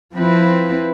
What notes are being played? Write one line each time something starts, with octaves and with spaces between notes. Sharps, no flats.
F3 C4 E4 B4